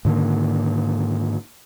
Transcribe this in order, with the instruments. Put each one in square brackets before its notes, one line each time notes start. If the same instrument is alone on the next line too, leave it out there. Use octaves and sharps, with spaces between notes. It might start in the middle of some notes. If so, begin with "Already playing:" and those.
[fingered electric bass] G#2 D3 D#3 A#3